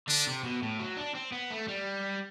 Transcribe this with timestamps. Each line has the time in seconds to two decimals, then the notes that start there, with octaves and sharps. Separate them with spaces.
0.08 D3 D4
0.27 C3
0.44 B2
0.62 A2
0.80 F#3
0.97 D4
1.15 C4
1.32 B3
1.50 A3
1.68 G3